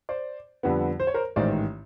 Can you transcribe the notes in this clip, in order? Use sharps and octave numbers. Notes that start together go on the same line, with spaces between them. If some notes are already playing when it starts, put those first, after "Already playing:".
C5 D5
F2 D3 G3 B3
C5
C#5
A#4 C5
A1 G#2 D#3 C5 D5